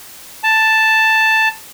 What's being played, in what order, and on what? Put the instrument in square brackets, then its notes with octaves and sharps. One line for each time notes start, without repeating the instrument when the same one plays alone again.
[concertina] A5